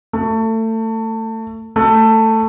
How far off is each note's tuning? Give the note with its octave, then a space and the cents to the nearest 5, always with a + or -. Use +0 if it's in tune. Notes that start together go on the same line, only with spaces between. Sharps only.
A3 +25
A3 +15